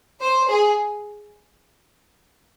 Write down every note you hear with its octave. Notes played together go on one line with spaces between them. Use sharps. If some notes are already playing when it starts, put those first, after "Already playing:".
C5
G#4